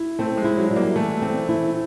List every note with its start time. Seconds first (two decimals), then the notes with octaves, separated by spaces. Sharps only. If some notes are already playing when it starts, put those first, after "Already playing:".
Already playing: E4
0.19 A3 C4
0.37 G#3
0.44 E4
0.57 F#3
0.71 G3
0.76 A#3
0.96 E3 A3
1.22 C4
1.49 E4